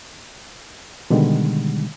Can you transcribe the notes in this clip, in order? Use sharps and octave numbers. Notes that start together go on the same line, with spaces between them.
B2 D3 D#3 G3 G#3